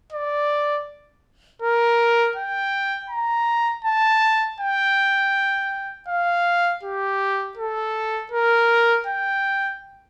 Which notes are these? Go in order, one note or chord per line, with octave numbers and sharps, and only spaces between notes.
D5
A#4
G5
A#5
A5
G5
F5
G4
A4
A#4
G5